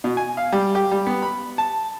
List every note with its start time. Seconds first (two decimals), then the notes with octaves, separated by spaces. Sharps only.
0.04 B2
0.17 G#5
0.37 F5
0.52 G3
0.75 G4
0.91 G3
1.07 B3
1.22 B5
1.58 A5